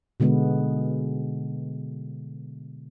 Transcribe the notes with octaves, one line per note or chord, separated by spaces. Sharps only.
B2 D3 G#3 B3